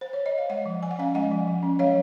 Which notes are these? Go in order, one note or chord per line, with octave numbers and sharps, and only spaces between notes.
C5
C#5
D#5
F5
G#3 D#5 F#5
F3
F3 G#5
F#5
C#4 F5 G#5
G#3 D#5 F#5
F3
F3
C#4
F#3 C#5 F5